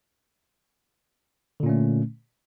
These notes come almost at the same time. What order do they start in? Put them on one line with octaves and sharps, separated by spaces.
D3 A#2 C#4 A3